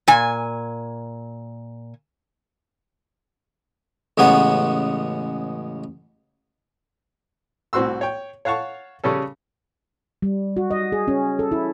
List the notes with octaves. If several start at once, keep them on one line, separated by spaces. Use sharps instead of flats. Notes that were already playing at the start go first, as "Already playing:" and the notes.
A#2 G#5
A1 C#3 G#3 B3 C#5 F#5
C2 A2 C4 F#4 C6 E6
C#5 G5
C#5 F5 F#5 A5 C#6
C#3 G3 C#4 A4
G3
F#4
D#5
G#4
C#4
A4
E4